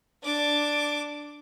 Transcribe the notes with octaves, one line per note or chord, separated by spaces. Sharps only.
D4 D6